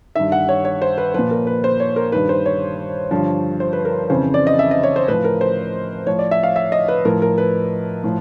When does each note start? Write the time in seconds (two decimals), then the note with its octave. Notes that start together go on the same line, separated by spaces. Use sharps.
0.15 G2 D#3 E5
0.32 F#5
0.49 C#5
0.65 C#5
0.82 C5
0.98 B4
1.14 A#2 F3 B4
1.31 A#4
1.47 B4
1.64 C5
1.80 C#5
1.96 A#4
2.12 G2 D#3 B4
2.29 C5
2.46 C#5
3.11 G2 D3 F3
3.60 C5
3.73 B4
3.85 A#4
4.10 F2 C#3 E3 C5
4.34 D5
4.47 D#5
4.59 E5
4.71 D#5
4.83 C#5
4.96 C5
5.08 A2 F3 B4
5.24 A#4
5.41 C5
6.07 A2 F3 C#5
6.19 D5
6.31 E5
6.43 F5
6.56 E5
6.72 D#5
6.88 B4
7.05 A2 F3 A#4
7.22 A#4
7.38 B4
8.04 A2 F3